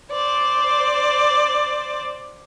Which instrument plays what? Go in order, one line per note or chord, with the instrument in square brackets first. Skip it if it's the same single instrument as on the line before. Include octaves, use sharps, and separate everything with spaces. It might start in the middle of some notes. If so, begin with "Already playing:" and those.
[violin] C5 D5